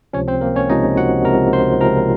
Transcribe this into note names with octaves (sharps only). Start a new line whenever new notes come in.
C#2 C3 F3 C#4 C#5
C4 C5
A#3 A#4
C#4 C#5
C#2 C3 F3 D#4 D#5
F#4 F#5
C#2 C3 F3 A#4 A#5
C5 C6
C#2 C3 F3 A#4 A#5